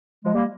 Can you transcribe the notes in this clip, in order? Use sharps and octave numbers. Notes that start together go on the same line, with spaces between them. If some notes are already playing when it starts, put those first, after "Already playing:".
F3 G#3
G3 A#3